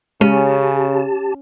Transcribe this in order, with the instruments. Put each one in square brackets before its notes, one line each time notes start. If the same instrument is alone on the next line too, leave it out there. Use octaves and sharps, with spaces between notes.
[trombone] C#3 [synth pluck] G#3 [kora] C#4 [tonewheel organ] G4 A5